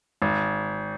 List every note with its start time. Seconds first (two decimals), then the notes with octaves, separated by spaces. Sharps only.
0.22 G#1